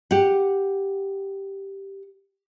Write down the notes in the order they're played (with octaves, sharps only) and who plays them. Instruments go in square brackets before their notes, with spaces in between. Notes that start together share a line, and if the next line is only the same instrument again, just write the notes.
[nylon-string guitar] G4 F#5